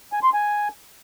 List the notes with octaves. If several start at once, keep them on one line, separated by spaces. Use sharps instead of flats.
G#5
C6
G#5